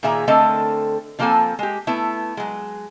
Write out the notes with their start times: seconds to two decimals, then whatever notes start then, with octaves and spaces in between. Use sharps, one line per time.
0.03 A#2 D#3 G#4 E5 A#5
0.28 D3 A3 C4 A4 A#4 D#5
1.19 D3 F3 A#3 C4 A4 G#5
1.59 G#3 G4
1.87 A3 B3 E4
2.37 F#3 G#3